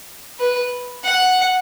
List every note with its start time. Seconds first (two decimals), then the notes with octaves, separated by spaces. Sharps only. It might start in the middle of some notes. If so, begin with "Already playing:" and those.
0.39 B4
1.04 F#5